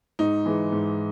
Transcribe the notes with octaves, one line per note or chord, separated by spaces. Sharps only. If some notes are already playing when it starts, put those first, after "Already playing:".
G#2 D#4
E3 G#3
G#2